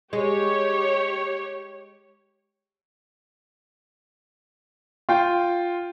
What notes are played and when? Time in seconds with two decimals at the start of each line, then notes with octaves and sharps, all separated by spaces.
0.13 G#3 G4 C#5
5.09 F4 G5